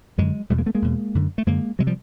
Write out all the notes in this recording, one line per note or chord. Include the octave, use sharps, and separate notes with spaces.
F#2 D3 F#3 G#3
E2 B2 G3 A3
G#3 A#3
A3 B3
G#3 A#3
E2 B2
F#2 D3
A3
F#2 D3 G#3 A#3
C3 F#3 G#3
F3 G3